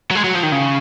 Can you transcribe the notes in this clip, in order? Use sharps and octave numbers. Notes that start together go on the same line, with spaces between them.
F#3
G#3
F#3
F3
D#3
C#3